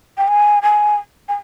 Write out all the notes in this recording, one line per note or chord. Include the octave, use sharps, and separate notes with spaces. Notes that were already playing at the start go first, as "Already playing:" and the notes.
G5
G#5
G#5
G#5